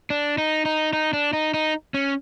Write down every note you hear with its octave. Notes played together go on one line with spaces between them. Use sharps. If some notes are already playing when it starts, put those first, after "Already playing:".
D4
D#4
D#4
D#4
D4
D#4
D#4
C#4